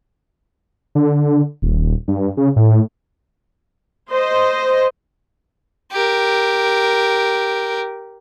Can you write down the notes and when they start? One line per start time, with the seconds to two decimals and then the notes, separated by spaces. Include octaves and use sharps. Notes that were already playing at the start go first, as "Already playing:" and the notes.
0.95 D3
1.62 D#1
2.08 G2
2.37 C#3
2.56 A2
4.11 C5 D#5
5.92 G4 A#4